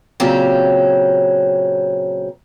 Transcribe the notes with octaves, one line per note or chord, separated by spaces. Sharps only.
A#2 C#3 F#3 C4 C#4 G4